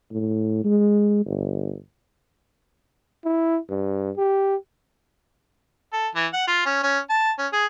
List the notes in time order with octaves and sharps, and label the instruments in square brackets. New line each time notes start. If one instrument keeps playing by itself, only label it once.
[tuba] A2
G#3
G1
[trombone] E4
G2
G4
[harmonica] A4
E3
F#5
F4
C#4
C#4
A5
C#4
G#4